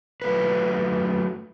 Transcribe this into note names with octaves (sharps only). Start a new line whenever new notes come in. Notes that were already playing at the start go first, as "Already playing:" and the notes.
F#3 A3 B4